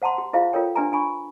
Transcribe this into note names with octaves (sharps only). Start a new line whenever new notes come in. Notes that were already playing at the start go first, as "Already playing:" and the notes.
C5 F#5 A5 A#5 C6
G4
E4 F4 G#4 C5 E5 F5
F4 A4 A#4 C#5 G5
D4 G4 B4 E5 G#5 A#5
D4 G#5 B5 C#6